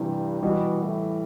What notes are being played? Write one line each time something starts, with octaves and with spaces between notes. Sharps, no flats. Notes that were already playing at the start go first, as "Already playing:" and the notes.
Already playing: G2 C3 E3
B2 E3 G3
A2